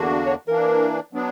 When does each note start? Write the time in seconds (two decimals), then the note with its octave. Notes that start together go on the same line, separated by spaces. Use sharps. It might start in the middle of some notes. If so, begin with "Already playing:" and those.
Already playing: E2 D3 A#3 D4 F#4
0.26 C#5
0.48 E3 A#3 D4 A#4
1.13 F#3 B3 D4